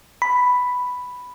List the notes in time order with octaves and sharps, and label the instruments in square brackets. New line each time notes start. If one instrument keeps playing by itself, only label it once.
[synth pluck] B5